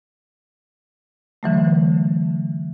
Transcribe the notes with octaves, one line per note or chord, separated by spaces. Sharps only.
D3 E3 F#3 A3